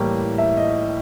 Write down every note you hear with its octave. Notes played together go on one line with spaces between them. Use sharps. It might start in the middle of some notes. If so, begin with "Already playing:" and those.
Already playing: A2 E3 G3 A#3
E5
D#5